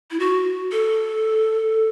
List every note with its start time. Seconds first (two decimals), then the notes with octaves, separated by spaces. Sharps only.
0.11 E4
0.19 F#4
0.72 A4